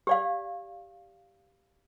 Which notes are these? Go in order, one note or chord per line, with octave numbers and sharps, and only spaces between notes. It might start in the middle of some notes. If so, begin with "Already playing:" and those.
G4 D5 F5